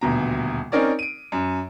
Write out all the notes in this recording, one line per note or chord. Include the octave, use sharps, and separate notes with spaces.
D#1 D2 B2 A#5
C4 C#4 D#4 A#4 C#5 D5
D7 D#7
F#2